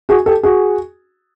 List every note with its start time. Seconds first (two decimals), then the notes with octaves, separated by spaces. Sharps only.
0.09 F#4 G#4
0.26 G4 A4
0.43 F#4 G#4